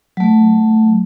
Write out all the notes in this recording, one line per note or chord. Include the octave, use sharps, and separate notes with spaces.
F#3 A3